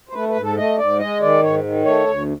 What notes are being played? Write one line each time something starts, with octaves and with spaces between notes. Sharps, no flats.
C5
A3 B4
B4
G#2
A4
A3 D#5
G#2 D5
G#3 D#5
D#3 D5
G#2 C#5
D#3
A3 C#5
D2